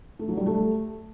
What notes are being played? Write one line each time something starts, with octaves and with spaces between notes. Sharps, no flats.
A3
F#3
G3
A3